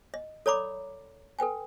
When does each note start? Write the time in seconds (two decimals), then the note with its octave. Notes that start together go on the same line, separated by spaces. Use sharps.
0.14 D#5
0.46 A4 C#5 D5 A#5 B5 D6
1.39 A4 B4 G5 G#5